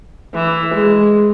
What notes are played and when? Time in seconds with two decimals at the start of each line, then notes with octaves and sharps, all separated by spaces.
0.35 E3
0.75 G#3